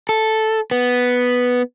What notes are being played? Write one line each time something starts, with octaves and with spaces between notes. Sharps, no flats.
A4
B3